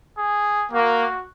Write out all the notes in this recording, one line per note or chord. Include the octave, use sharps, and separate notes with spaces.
G#4
A#3 F#4